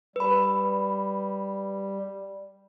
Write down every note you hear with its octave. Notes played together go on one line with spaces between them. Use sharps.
G3 B4 B5